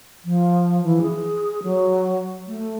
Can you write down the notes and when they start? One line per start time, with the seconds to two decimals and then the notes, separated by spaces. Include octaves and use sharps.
0.25 F3
0.83 E3
1.02 G#4
1.63 F#3
2.47 A3